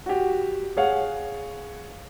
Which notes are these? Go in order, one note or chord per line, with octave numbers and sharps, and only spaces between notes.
F#4 G4
G#4 C#5 F5 F#5